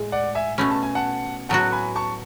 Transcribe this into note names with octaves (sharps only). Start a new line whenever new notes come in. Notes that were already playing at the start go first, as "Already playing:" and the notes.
Already playing: A2 G#3
D5 F#5
E5 G#5
B2 A3 C#4 B5
A5
G#5
F#5 A5
A2 F#3 B3 F#4 F#5 A5
G#5 B5
A5 C#6